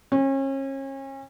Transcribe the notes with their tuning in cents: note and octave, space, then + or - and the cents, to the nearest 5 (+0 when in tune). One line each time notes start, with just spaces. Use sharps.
C#4 -35